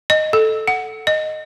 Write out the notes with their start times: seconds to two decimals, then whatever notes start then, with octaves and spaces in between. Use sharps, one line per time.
0.10 D#5
0.33 A4
0.67 F#5
1.07 D#5